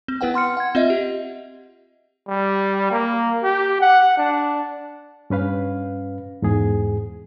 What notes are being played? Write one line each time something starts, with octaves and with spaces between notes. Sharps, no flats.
C4
B3 E4 B4 F#5 G5
F#5 C6 F6 C#7
F#5 G#6
C4 F4 D#5 E5
G4
G3
A#3
G4
F#5
D4
G2 C#4 B4 F5
E2 G#2 G#4